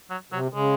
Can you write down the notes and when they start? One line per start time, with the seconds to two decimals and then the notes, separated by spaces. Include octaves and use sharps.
0.10 F#3
0.32 C3 F#3
0.53 C#3 G#3